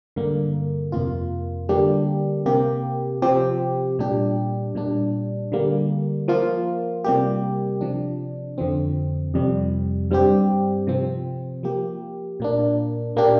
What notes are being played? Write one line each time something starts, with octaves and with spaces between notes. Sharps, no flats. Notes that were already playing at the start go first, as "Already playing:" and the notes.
G2 D3 A#3
F2 C3 A#3 F4
D3 G3 A#3 D4 G4
C3 A#3 G4
C3 F3 C4 G4
A#2 G3 D4 G4
A#2 G3 D4
D3 G3 A#3
F3 A#3 F4
C3 G3 A#3 G4
C3 F3 D4
F2 D3 F3 C4
F2 C3 G3
G2 G3 C4 G4
C3 F3 C4
F3 A#3 G4
A#2 A#3 D4
A#2 A#3 D4 G4